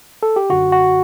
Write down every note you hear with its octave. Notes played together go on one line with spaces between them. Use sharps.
A4
G4
F#2 D3 F#4
F#4